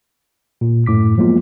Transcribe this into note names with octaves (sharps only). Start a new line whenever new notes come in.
A#2
F#2 A2 D6 B6
F3 F#3 G#3 A#3 B3 F4